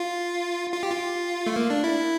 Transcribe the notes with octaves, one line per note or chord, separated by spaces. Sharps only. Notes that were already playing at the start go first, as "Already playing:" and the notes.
Already playing: F4
F4
G4
F4
A3
A#3
D4
E4